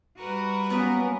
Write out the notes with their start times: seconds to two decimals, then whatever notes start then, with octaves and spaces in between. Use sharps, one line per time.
0.18 G3 F#4 A#4 B4
0.70 F#3 A#3 B3 C#4